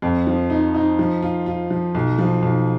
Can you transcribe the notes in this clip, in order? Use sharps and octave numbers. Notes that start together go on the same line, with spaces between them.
F2
F3
D#4
D#4
F3
F4
F4
F3
B1
F3
B1